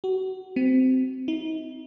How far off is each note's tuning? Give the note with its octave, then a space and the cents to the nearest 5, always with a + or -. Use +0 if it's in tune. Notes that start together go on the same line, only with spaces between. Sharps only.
F#4 +25
C4 -20
D#4 +35